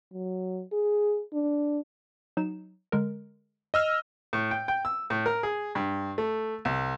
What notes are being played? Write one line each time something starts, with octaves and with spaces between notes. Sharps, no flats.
F#3
G#4
D4
F#3 D#4 E7
D3 G#3 A#4
D#5 E6 F6
A2
G5
G5
E6
A2
A#4
G#4
G2
A3
C2